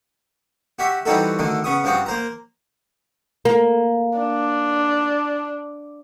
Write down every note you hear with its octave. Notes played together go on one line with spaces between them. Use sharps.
F#4 G4 E5
E3 G3 C4 D#4 F#4 A4
D2 D3 D#3
C#3 B3 C#6 D#6
G2 F3 C4 F#4 D#6
A#3 C5 A#5
A#3
D4